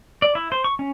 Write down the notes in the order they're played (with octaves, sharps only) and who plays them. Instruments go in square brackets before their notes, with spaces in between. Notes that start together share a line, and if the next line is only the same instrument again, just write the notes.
[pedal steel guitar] D5
E4
C5
C#6
C#4